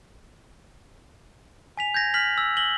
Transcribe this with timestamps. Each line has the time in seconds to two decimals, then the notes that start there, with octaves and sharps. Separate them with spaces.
1.77 G#5 B6 F7
1.94 G6 G#6 A#6
2.14 F6 B6 F#7
2.38 E6
2.57 A#6 F#7 G7